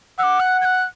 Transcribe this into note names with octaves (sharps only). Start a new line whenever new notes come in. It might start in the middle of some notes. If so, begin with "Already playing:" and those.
F#5 D6 E6
F#6
G#6
F#6